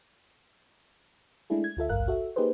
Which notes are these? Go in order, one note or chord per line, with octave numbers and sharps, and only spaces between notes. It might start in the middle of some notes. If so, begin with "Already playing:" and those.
G#3 A3 D4 E4 G#4
G#6
D2 F4 A4 E5
G#1 C#2 G2 A#4 F5 F#6
F#4 A4 E5
A#3 D#4 G4 G#4 B4 C5